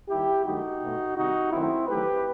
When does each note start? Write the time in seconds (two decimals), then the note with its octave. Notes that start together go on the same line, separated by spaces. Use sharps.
0.09 D#2 D#3 G3 E4 G4
0.45 G2 D#3 F#3 A3 D#4 F#4
0.81 B1 B2 A3
1.16 C2 C3 D#3 G3 D#4 F#4
1.52 F#2 D#3 F#3 A3 C4 E4
1.88 E2 D#3 F#3 A3 G4 B4